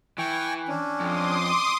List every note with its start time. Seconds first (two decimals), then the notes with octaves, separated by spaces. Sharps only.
0.18 E3 G5 G#5 C#6
0.68 C#4 D4
1.00 F2 C6 D6 D#6